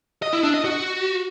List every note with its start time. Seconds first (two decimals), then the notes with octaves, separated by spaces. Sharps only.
0.22 D#5
0.33 E4
0.43 D4
0.54 D#5
0.64 F#4